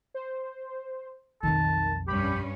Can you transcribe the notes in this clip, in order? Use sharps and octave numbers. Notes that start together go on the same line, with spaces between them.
C5
B1 F2 D#3 A5
G2 G3 C#4 G4 B5